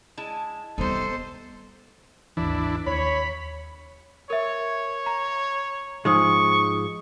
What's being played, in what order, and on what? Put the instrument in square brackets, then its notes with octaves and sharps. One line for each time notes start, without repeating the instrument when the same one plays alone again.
[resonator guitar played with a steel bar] G#3 E4 A5
[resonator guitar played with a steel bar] C3 D#4 [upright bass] G3 B3 [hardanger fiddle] A4 C5
[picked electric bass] G#1 D#2 E3 [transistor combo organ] D4 E4
[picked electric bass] D#2 [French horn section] C#5 [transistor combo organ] B5
[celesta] A#4 E5 [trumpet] C#5
[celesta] A#5
[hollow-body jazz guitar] G#2 F3 G#3 [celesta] D#4 D#6 [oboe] C#6